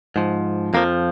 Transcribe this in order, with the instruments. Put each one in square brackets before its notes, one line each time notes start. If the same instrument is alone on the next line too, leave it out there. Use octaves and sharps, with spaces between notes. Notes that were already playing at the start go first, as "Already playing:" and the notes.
[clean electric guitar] G#2 F3
F2 F3 A#3